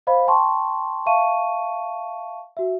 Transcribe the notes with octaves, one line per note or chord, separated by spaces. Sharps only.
C5 D#5 F5 B5
G5 A5 C6 C#6
E5 F5 A5 C#6 D#7
F#4 E5